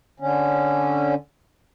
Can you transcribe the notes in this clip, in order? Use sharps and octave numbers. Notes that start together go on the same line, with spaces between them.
D3 C#4